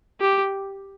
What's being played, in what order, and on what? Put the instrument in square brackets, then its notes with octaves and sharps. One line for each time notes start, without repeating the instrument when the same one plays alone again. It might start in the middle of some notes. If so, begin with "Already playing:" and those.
[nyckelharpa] G4